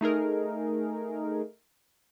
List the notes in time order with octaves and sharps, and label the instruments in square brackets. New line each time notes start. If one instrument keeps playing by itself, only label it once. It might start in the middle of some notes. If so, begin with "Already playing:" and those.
[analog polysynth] A3 D#4 G#4 A#4